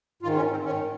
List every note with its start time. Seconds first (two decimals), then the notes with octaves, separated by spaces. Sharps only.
0.22 G#2 F4
0.26 D#3
0.36 C#4
0.51 C4
0.64 D#3 C#4
0.69 G#2